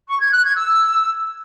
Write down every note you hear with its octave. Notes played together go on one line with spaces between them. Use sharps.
C#6
G#6
F#6
G#6
E6